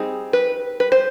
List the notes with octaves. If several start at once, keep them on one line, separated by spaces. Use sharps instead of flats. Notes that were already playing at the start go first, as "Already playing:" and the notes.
Already playing: G3 C4 D#4 G#4
B4
B4
C5